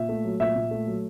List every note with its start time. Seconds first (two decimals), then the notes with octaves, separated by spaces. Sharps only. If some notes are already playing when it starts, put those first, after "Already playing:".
Already playing: A#2 E5
0.09 A3
0.25 F#3
0.40 A#2 E5
0.56 A#2
0.71 A3
0.87 F#3